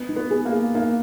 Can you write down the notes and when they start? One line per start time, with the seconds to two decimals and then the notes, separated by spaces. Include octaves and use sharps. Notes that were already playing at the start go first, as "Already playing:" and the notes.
Already playing: B3
0.09 D#4
0.16 B3
0.31 G#4
0.45 A#3
0.52 G#4
0.75 A#3 D#4